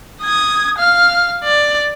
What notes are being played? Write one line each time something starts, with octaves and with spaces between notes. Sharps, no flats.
D#6 G#6
F5 F6
D5